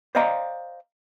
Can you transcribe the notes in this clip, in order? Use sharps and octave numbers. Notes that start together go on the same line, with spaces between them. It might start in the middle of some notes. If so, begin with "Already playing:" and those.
C5 D5 D#5 F5 G5 A#5